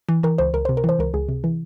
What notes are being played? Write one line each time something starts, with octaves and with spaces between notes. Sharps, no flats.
E3
E3 A#4
C#2 C5
C#2 A#4
C3 C5
A#4
E3 C5
C#2 A#4
C#2 G#4
C3
E3